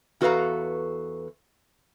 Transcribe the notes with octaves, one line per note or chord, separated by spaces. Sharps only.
E2 F#4 A4 B4 F5 A#5